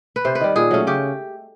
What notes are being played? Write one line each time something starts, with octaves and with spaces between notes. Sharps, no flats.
B4
C3 C5
B4
D#3 G3
A#2 G#4
F#3 A3 C#4
C#3 G4